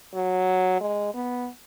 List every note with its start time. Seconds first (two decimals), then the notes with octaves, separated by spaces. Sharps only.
0.14 F#3
0.81 G#3
1.14 B3